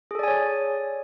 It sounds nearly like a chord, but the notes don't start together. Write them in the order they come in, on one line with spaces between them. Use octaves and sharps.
G#4 A4 D5 G#5 C#5